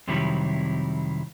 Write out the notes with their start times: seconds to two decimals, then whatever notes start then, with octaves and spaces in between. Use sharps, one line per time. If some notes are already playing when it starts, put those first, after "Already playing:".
0.07 F2 C3 D#3 F#3 G3 E4